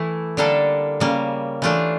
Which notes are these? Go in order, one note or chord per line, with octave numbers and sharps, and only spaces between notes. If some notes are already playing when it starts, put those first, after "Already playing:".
Already playing: E3 A3 E4
D3 G3 A#3 D4 A4
C#3 G3 A#3
E3 A3 D4 F4